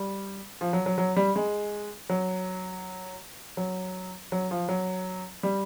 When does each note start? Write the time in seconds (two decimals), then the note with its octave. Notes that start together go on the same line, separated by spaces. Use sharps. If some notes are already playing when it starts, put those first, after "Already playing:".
Already playing: G3
0.61 F3
0.73 F#3
0.86 F#3
0.98 F#3
1.16 G3
1.36 G#3
2.09 F#3
3.57 F#3
4.32 F#3
4.51 F3
4.69 F#3
5.43 G3